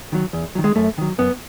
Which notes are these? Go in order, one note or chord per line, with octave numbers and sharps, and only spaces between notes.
D#3 F#3
E2
D#3 F#3
G#3
F#2 A3
D#3 F#3
F#2 B3